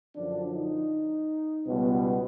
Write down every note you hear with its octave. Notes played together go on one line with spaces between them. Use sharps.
F#2 D3 F3 D4
D#4
C#2 B2 G3 B3